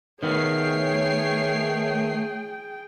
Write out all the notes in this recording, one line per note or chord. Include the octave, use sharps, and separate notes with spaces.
D#3 A3 B3 G#4 C#5 G5 C7